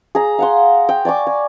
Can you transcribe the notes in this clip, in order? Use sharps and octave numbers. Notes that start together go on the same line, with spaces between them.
G#4 A#5
F5 F#5 C6
G5
D5 G#5 C#6 D6
G#5